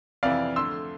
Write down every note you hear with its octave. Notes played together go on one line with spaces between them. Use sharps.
F2 C3 E3 D5 F5
F2 D3 A3 C6 E6